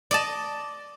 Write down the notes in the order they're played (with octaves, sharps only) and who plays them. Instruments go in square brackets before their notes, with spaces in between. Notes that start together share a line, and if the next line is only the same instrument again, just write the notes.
[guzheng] D5 D#5 A5